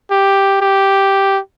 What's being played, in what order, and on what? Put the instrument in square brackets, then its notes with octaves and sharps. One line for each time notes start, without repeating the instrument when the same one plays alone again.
[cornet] G4
G4